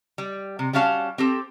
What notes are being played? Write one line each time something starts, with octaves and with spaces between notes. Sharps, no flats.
G3
C3
G3 C#4 F#4 F5 A5
C4 G4 A4